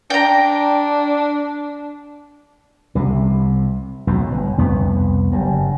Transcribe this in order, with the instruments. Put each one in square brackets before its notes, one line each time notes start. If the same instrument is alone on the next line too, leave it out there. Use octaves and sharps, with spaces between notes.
[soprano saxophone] D4 [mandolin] G5 A#5
[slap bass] C2 C3
B1 E2 A2
G1
C2 F2 B3
F#1 G2